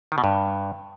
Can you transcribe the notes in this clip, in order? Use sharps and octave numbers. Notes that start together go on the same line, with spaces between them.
D#3
B2
G2